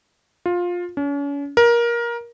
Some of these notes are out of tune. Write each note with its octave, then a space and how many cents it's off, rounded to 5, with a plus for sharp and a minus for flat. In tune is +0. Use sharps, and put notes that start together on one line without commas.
F4 +15
C#4 +40
A#4 +20